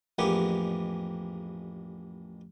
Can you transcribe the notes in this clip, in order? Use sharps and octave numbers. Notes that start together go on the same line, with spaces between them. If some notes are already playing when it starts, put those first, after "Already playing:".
A1 F2 A#3 B3 G4 G#4